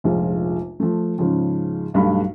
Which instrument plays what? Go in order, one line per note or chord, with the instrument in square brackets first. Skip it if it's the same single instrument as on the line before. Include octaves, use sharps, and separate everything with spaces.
[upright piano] F1 A#1 G#3 F4
F3 A3
G#2 C#3 F3
B1 G2 A3 F5 B5